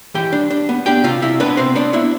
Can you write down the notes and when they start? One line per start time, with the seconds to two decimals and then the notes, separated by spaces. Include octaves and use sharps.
0.14 E3 G4 G5
0.33 D4
0.50 D4
0.69 B3
0.86 D4 G4 G5
1.04 C3 F4 F5
1.22 C3 E4 E5
1.40 B3 D4 B4
1.57 C3 C4 C5
1.76 B3 D4 D5
1.93 D4 E4 E5